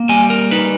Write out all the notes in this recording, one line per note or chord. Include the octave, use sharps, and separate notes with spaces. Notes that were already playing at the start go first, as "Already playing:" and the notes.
Already playing: A#3
G3 G#5
A#4
D#4 B4